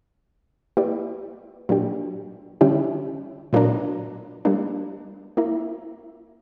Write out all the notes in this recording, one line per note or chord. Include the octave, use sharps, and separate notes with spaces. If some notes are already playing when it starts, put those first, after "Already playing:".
A#3 E4 G4 B4 D5
A#2 F#3 A#3 D4 G4
D3 G3 C#4 E4 G4
A#2 F#3 A#3 D4 A#4
G3 A#3 D4
A#3 E4 A#4